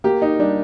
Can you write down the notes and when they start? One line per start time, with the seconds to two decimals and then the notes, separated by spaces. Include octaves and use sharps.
0.04 A#3 G4
0.22 D#4
0.39 G3 D4